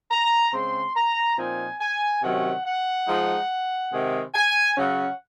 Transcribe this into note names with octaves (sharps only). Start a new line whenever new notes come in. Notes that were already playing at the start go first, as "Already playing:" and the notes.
A#5
C#3 G#3 C4 C6
A#5
A#2 F3 C4 D#4 G#5
G#5
C3 D#3 F#3 C#4 F#5
F#5
F3 G#3 D#4
C3 D#3 G#3
G#5
C#3 F#3 C#4 F#5